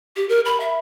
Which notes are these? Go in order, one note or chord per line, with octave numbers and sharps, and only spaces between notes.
G4
A#4
B5
E5